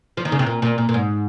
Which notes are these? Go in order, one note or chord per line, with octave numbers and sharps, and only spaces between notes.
F3
D#3
C#3
C3
A#2
A#2
A#2
A#2
G#2